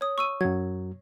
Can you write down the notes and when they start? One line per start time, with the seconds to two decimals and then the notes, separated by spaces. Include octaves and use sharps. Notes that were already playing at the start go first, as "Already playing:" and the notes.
0.01 C#5 D#6
0.18 C#6 E6 D#7
0.41 F#2 F#3 G#6